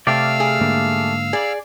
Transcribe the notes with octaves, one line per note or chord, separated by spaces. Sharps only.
C3 A3 G4 D5 F5 E6 F6
G#4
G#2 D3 A#3
G#4 D5